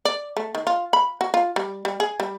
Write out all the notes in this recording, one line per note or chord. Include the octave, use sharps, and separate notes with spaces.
D5
A3
D#3
F4
B5
F#4
F4
G3
G3
G#4
G3